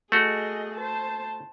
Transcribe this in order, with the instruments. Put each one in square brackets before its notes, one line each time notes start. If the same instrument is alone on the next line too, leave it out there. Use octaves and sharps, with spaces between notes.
[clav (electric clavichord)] A3 F#4 [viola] G#4 D#5
[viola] C5 A5